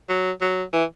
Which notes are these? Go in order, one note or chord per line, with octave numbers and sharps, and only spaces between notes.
F#3
F#3
E3